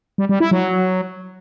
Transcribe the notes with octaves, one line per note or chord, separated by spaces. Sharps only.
G3
G3
E4
F#3